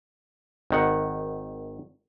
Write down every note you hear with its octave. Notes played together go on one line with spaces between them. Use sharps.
G#1 D#3 F#5